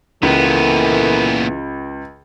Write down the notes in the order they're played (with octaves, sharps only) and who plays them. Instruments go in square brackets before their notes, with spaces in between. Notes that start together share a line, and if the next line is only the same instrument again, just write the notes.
[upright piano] C#2 [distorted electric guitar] A#2 B3 [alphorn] E3 [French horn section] A4 A#4